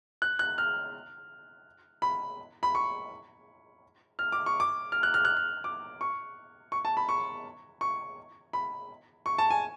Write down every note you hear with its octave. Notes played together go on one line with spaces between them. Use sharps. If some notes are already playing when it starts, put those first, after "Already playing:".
F#6
F#6
F6
B5
B5
C#6
F6
D6
C#6
D6
F6
F#6
F6
F#6
F6
D6
C#6
C#6
A5
B5
C#6
C#6
B5
C#6
A5
G#5